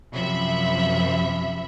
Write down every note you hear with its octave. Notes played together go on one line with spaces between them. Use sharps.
F#2 C3 F3 E5 B5